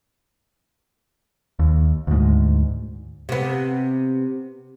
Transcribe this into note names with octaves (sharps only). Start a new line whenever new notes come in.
D#2
D2 G#2
C3 B3